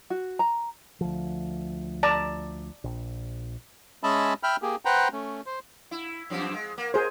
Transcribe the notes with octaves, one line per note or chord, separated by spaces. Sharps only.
F#4
A#5
D2 F3
D5 A5 A#5
A#1
G#3 C#4 D#5 E5 A5 B5
E5 G5 B5 F6
A#3 G4 G#4
B4 C5 F#5 G5 A#5
A3 C#4
C5
E4
F#2 F3 C4
G#3
A#3
G#4 A#4 C5